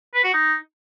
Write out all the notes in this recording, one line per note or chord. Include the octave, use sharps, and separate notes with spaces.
B4
F#4
D#4